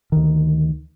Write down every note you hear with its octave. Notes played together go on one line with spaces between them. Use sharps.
D2 D#3